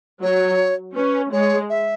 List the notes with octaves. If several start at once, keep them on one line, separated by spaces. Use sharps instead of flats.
F#3 C#5
C#4 B4
G#3 C#5
E5